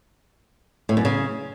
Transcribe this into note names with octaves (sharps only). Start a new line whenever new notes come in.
A2
F#2
C#3